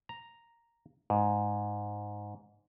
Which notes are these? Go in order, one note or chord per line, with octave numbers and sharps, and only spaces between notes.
A#5
G#2